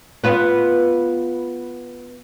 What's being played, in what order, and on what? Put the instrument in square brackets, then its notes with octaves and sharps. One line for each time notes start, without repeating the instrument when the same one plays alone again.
[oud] B3 F4 B4